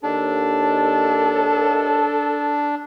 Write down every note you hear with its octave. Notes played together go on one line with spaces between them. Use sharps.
D#2 D4 A4